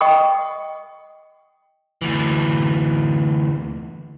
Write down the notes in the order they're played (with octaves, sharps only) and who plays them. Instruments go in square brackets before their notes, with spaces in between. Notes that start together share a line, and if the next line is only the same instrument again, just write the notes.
[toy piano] D#5 F#5 G5 C#6 D#6
[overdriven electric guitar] D2 E3